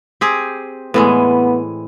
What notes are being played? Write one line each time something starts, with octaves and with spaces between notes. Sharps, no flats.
C4 G4 G#4
A2 E3 G#3 B3